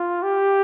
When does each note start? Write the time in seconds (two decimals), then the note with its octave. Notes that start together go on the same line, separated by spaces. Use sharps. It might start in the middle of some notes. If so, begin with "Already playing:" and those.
Already playing: F4
0.23 G4